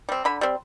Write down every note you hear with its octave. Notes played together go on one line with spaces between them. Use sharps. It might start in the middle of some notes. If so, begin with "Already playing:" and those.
G3 C4
D3 B5
G3 C4